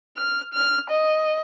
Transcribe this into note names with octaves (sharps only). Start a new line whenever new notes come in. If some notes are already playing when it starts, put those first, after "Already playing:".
F6
F6
D#5